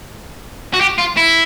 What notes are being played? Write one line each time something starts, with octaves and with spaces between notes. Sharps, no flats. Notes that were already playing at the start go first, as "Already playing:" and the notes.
F#4
G4
F4
E4